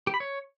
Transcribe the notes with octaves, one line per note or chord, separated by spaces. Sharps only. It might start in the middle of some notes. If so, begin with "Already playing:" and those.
G4
B5
C#5